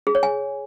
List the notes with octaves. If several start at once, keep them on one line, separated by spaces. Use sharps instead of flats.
G#4
C#5
G#5